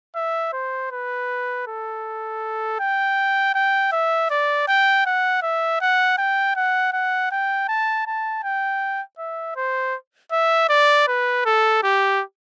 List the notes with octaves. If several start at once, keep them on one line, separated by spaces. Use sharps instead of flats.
E5
C5
B4
A4
G5
G5
E5
D5
G5
F#5
E5
F#5
G5
F#5
F#5
G5
A5
A5
G5
E5
C5
E5
D5
B4
A4
G4